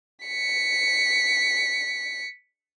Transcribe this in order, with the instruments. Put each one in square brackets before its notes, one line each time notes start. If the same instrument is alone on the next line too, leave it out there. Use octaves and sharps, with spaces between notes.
[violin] B6 C#7